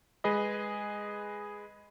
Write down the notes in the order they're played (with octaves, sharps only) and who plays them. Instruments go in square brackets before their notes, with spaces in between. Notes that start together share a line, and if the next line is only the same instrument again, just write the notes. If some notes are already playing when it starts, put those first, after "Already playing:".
[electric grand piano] G#3 G#4 B4 D#5